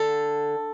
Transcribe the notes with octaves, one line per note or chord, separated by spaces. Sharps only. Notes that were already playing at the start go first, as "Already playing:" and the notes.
Already playing: D3 A4